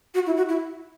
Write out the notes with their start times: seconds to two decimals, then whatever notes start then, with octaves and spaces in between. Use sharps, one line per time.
0.14 F#4
0.26 E4
0.37 F#4
0.49 E4